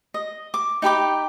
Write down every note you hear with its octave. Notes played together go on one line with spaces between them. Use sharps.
D#5
D6
D#4 G4 B5 D6